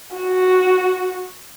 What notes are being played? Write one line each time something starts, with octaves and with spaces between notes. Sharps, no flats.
F#4